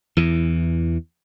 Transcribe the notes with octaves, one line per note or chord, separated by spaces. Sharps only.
E2 E3